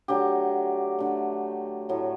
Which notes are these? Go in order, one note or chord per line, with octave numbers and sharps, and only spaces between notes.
D3 F#3 A3 G4
D3 A3
A2 F#3 A3